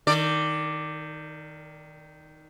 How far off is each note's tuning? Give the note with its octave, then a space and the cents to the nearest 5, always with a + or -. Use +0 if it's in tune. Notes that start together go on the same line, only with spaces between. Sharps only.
D#3 +5 A#4 -45 D5 +0